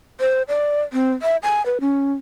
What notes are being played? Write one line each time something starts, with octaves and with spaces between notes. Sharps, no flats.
C5
D5
C4
E5
G#5
B4
C#4